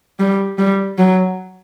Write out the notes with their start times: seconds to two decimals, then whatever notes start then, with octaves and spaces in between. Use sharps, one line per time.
0.19 G3
0.58 G3
0.99 F#3